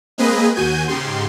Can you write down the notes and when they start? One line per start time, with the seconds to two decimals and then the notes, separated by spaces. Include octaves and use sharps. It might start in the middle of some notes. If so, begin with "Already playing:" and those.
0.18 G#3 A#3 C4 G#4 B4 D#5
0.55 D#2 F#4 G#5 G6 D#7
0.88 G#2 C#3 G4 C6